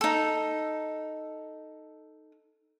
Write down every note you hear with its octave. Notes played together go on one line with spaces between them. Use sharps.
D#4 A4